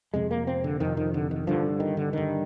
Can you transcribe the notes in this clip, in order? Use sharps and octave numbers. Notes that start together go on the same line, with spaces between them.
F2 C3 G#3
A#3
C4
D3
F2 C3 D#3
D#3
D3
D#3
G2 D3 F3
D#3
D3
G2 D3 D#3